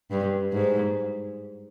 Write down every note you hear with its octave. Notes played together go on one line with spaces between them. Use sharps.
G2
G#2